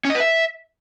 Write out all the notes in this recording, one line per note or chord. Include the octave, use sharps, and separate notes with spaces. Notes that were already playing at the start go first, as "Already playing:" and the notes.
C#4
D#5
B4
E5